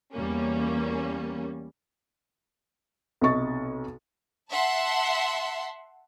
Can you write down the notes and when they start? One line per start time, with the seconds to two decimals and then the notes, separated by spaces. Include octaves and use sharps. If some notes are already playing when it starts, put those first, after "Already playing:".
0.13 E2 G3 A#3 C#4
3.21 B1 C3 D#5 C#6 A6
4.50 E5 F#5 A5 C6